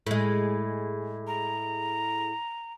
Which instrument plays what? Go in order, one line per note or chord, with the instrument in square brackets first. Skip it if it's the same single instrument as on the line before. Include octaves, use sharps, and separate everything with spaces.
[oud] A2 G#3
[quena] A#5